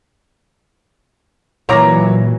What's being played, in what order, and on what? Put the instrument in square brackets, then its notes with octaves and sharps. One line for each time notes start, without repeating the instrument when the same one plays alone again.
[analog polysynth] A#2 [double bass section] E3 F#3 [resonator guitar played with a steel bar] A#3 A#5 [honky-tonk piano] C#5 D6 A#6